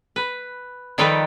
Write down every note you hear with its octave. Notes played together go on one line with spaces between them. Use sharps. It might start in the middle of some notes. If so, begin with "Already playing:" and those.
B4
D#3 F3 G3 D#4 A4 B4